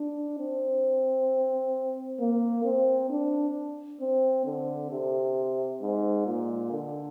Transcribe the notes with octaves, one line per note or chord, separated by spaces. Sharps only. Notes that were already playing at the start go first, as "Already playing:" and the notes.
Already playing: D4
C4
A#3
C4
D4
C4
D3
C3
G#2
A#2
D3